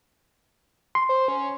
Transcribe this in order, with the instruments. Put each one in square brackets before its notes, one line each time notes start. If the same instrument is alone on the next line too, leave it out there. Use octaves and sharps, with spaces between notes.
[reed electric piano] C6
[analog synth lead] C5
C#4